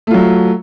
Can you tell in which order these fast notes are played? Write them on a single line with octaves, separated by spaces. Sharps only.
A3 F4 F#3